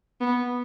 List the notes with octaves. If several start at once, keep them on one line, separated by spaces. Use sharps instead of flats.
B3